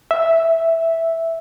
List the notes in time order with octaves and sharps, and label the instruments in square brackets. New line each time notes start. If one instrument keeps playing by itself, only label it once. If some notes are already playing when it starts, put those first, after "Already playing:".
[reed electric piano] E5